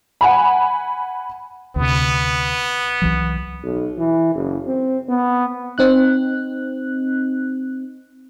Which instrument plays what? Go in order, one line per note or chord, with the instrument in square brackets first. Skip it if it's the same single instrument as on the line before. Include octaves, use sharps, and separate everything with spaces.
[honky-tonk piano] F#5 G#5 B5
[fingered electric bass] D2 C3 [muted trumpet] B3
[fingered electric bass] C2 E3 F#3
[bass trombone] B1
E3
F#1
C4
B3
[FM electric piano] C4 D#4 F#6